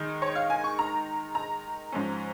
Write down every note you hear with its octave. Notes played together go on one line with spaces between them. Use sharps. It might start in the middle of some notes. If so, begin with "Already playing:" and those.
Already playing: D#3 G#3 D#4
C#5
F5
G#5
C#6
A#5
A#5
G#2 F3 C#4